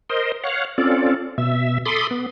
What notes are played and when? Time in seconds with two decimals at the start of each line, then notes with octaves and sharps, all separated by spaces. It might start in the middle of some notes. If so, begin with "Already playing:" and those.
0.10 A#4 C5 D#5
0.44 C#5 F5 F#5
0.78 C4 C#4 F4 A4 D5
1.38 B2 E5
1.86 A4 B5 C6 D6 D#6
2.11 B3